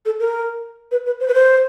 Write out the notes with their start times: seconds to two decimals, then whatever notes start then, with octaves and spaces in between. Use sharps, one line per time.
0.05 A4
0.19 A#4
0.91 B4
1.05 B4
1.20 C5
1.27 B4
1.34 C5